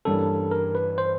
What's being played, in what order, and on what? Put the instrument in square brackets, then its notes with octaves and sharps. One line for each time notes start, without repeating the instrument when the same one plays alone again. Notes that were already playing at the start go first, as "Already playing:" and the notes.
[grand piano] G2 E3 G3 A#3 C#4 [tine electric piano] A4
[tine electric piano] A#4
B4
C5